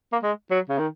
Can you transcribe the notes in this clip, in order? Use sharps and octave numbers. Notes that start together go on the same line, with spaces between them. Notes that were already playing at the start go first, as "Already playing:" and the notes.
A#3
G#3
F#3
C#3
D#3